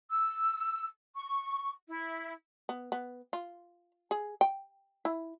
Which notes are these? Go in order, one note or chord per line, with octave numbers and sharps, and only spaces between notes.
E6
C#6
E4
B3
B3
F4
G#4
G5
E4